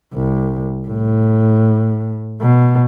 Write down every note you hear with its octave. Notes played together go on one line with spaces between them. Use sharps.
C2
A2
B2